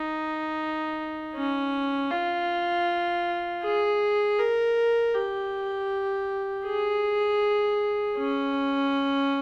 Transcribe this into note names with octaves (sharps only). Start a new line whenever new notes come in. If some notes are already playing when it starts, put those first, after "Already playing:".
Already playing: D#4
C#4
F4
G#4
A#4
G4
G#4
C#4